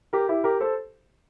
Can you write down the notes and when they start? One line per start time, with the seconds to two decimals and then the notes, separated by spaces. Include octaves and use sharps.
0.13 G4 A#4
0.29 E4 G4
0.44 G4 A#4
0.60 A4 C5